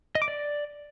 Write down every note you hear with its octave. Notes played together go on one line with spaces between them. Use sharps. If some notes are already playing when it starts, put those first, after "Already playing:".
D#5
D6
D5